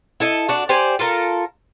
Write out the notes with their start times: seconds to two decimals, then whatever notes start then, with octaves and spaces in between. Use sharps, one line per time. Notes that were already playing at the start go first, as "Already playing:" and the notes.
0.20 E4 A4 D#5
0.49 D4 F#4
0.69 G4 C5 D5 G#5
0.99 F4 A4 A#4